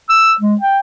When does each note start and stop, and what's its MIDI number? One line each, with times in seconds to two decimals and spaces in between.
0.09 0.34 88
0.41 0.56 56
0.61 0.80 79